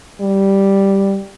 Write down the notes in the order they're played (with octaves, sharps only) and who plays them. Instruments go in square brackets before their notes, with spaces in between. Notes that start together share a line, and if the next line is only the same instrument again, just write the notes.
[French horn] G3